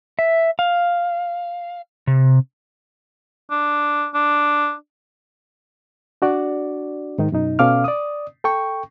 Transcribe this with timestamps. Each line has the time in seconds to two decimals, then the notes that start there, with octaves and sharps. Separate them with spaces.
0.19 E5
0.59 F5
2.07 C3
3.51 D4
4.14 D4
6.22 D4 F#4 D5
7.18 G#2 D#3 D#4
7.32 F#2 B2 D#4
7.59 B2 C#4 A4 F5 D6 F6
7.84 D5 D#6
8.44 A4 G5 C#6